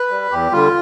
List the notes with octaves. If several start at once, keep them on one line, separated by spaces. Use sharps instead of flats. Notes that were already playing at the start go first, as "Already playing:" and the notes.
Already playing: B4
G3
E2 G4
D3 G3 F4